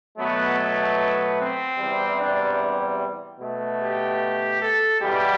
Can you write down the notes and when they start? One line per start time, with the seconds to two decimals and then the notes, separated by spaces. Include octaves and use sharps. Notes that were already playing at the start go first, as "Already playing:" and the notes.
0.16 B2 F#3 A3 B3
0.57 B3
1.38 C4
1.78 E2 C3 G3
2.19 D4
3.39 B2 A3
3.80 G4
4.60 A4
5.00 E2 B2 G3 G4